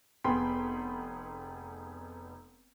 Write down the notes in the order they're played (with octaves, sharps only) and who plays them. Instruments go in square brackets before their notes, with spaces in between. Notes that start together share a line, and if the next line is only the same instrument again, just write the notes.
[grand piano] F1 B3 G#4 G5 B5 C6